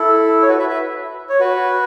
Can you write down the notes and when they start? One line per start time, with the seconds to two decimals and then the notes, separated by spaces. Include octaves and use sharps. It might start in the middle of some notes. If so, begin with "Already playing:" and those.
Already playing: E4 A4
0.42 C#5
0.49 F#4 B4
0.59 B4 E5
0.69 B4 E5
1.29 C#5
1.40 F#4 B4